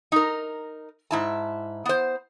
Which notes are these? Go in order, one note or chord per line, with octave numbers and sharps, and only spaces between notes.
D#4 A#4
G#2 E4 A5
B3 C5